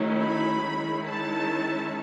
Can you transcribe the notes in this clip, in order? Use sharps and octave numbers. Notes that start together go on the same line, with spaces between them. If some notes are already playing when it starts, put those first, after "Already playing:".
Already playing: D#3 F#3 A3 C#4 E4
B5
D#3 G#3 C#4 E4
A5